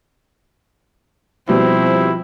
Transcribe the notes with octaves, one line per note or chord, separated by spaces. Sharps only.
B2 F3 G3 C4 E4